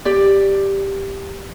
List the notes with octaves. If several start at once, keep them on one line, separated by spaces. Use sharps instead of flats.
G4 D5